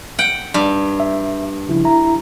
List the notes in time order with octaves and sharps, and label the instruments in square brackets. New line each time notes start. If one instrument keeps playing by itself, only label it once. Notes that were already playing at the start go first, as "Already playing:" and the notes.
[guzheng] F#5 G5
G2
[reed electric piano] E5
C#3 F3 E4
E4 E5 A#5